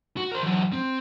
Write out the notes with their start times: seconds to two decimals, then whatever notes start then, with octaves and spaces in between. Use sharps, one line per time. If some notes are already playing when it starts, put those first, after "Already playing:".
0.17 F#4
0.32 A#4 C5
0.43 E3 F#3
0.73 C4